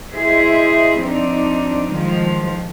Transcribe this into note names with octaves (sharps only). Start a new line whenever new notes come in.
E4 G#4 C5 D#5 E5
F3 C4 D4 D#4
D#3 F3 G#3